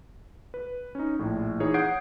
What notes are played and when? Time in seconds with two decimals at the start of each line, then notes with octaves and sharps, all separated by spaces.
0.54 B4
0.95 C#4 D#4
1.19 A#1 A2
1.60 E3 D#4 G#4 C#5
1.74 F#5 D#6 G6 G#6 C7 D7